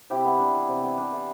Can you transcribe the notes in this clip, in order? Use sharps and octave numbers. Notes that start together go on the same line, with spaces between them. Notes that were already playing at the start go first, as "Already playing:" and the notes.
C3 E4 G4
B3
D4
E3
C3
B3
D4
E3